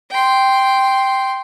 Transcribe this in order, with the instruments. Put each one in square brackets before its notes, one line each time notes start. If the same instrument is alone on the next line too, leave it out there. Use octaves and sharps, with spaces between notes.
[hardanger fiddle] G5 C6